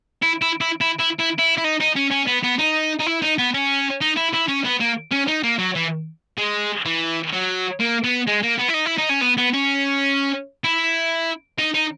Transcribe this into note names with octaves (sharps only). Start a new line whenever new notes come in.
E4
E4
E4
E4
E4
E4
E4
E4
D#4
D#4
C#4
C#4
B3
B3
D#4
D#4
E4
D#4
B3
C#4
D#4
E4
E4
C#4
B3
A#3
C#4
D#4
A#3
F#3
E3
G#3
E3
F#3
A#3
B3
G#3
A#3
B3
E4
D#4
E4
D#4
C#4
B3
B3
C#4
E4
D#4
D#4